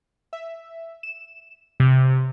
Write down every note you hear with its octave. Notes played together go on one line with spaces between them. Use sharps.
E5
E7
C3